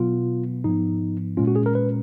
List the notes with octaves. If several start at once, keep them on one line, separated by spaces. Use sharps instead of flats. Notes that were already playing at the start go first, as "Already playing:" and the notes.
Already playing: B2 F#3 B3 F4
G#2 F3 B3 D#4
A#2 G#3 C#4 F4
F#4
G#4
A#4
B4